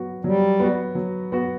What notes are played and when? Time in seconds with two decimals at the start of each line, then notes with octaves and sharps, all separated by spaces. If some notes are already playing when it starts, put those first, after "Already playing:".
Already playing: F#3 B3 F#4
0.24 F#3 G3
0.60 B3 F#4
0.95 F#3
1.32 B3 F#4